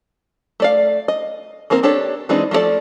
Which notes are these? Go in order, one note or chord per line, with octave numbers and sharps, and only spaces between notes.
A3 D5 F5
D#5
D#3 A#3 C4 A#4
C4 D4 G4 A4 C#5
E3 G#3 C4 D4 D#4
F3 A3 F4 A4 D5